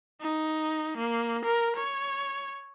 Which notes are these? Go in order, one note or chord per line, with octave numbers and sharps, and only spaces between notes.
D#4
A#3
A#4
C#5